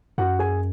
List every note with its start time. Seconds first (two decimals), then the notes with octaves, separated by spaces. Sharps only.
0.18 F#2 F#4 F#5
0.39 G#4 G#5